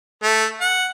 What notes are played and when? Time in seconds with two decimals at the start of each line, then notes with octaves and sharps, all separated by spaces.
0.23 A3
0.61 F#5